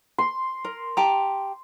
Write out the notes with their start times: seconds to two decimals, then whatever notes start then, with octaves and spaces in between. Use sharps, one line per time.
0.18 C6
0.65 A#4
0.97 G4 A5 A#5